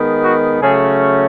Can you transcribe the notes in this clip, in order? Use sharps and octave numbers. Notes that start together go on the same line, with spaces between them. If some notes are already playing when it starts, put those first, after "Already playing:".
Already playing: D#3 G#3 B3
F#4
C#3 F#3 A3 C#4 G#4